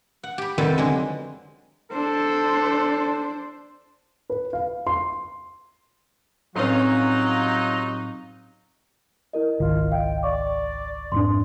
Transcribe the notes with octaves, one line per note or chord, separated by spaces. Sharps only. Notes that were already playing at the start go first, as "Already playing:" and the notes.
F#5
G4 B5
F2 C3 D#3 G3 B3 A4
D3 F#3 G#3
D4 A4 C5
B4
F5
C6
A2 F#3 G3 C4 C#4 D#4 F4 B4
E4 A#4 D#5
G#1 C#2 D#3 F4
D#5 F5 G5
D5 C#6 D6
F2 G#2 D4 C6